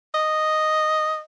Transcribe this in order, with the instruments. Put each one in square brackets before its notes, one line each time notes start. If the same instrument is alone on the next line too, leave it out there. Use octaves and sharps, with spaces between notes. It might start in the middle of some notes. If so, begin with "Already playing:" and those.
[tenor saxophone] D#5